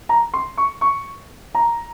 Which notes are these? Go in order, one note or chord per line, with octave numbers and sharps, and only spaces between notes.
A#5
C6
C#6
C#6
A#5